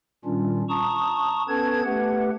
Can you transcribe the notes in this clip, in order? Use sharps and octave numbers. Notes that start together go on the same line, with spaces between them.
A#2 D#3 G3 C#4 D4 F4
A5 A#5 C#6 D#6
B3 C#4 A4 B4 A5 G#6
A3 G4 B4 F#5